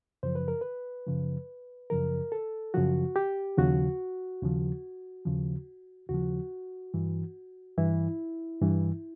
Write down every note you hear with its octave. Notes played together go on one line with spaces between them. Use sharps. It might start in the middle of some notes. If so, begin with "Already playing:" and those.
F#2 C#3 F3 C5
B4
A#4
B4
F#2 C#3 F3
F#2 C#3 F3 A#4
A4
F#2 C#3 F3 F#4
G4
D#2 C#3 F3 F#4
D#2 C#3 F3
D#2 C#3 F3
D#2 C#3 F3 F#4
G2 E3
G2 E3 E4
G2 E3